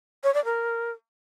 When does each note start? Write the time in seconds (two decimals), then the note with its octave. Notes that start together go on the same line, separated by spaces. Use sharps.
0.24 C#5
0.34 D5
0.45 A#4